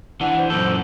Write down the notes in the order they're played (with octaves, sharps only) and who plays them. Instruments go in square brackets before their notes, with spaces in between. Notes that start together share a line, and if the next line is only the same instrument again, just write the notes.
[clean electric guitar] E3 D4 [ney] F#5
[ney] C5
[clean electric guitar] F#2 A#2 A4